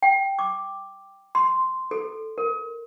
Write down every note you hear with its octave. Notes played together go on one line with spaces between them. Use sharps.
G5
D6
C6
A4
A#4